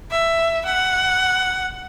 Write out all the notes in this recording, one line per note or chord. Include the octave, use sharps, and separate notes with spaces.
E5
F#5